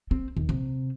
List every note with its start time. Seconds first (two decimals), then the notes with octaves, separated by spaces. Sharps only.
0.11 C4
0.37 D#2
0.49 C3